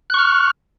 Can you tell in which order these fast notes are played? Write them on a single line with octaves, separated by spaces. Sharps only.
F#6 C#6 F6